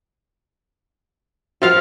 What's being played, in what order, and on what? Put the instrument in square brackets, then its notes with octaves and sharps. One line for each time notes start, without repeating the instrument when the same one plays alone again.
[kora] F3 F4 F5 [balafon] F#4